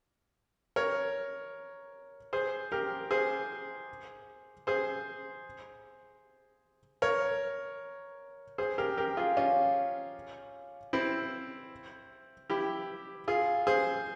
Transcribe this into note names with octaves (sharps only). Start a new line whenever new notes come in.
A#4 C#5
G#4 C5
G4 A#4
G#4 C5
G#4 C5
A#4 C#5
G#4 C5
G4 A#4
G4 A#4
F4 G#4
C#4 F4
C4 E4
E4 G4
F4 G#4
G#4 C5